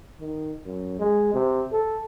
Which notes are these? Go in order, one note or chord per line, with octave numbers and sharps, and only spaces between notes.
D#3
F#2
G#3
C3
A4